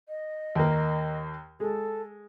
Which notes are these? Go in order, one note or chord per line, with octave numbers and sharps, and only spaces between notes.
D#5
D#2 A#3
G#3 A4